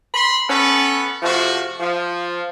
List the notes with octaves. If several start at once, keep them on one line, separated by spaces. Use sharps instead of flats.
B5 C6
B3 C#4 A4 B4
C3 F3 A3 F#4
F3